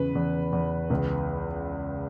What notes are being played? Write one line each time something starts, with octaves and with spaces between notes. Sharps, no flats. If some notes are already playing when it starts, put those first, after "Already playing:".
Already playing: E2 C#3 B4
E2
E2
C#2